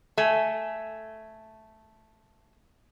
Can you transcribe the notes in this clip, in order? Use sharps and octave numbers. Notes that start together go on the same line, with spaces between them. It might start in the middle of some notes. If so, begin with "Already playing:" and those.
A3 G#5